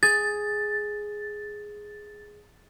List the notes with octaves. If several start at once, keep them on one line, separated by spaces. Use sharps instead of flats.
G#4 A6